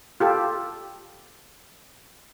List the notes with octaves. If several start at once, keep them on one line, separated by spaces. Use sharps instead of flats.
F4 G4 A4